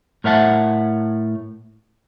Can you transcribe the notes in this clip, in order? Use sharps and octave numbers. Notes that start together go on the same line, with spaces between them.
A2 A#4 C#5 E5 F#5 A5